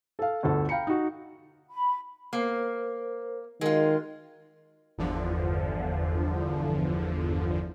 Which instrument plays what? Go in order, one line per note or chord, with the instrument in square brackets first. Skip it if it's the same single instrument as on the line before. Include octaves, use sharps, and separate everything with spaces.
[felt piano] A4 F5
G1 D2 A4
F5 G5 A#5 B5 C#7
D#4 F#4
[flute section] B5
[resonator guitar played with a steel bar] A#3 [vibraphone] A#4 C5
[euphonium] D#3 [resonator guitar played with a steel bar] G#3 F4 [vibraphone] F#4 G#4 D#5
[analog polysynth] G1 E2 D3 F3